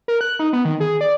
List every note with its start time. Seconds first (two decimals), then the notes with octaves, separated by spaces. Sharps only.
0.08 A#4
0.21 F#6
0.39 D#4
0.53 B3
0.65 D#3
0.80 G#4
1.01 D5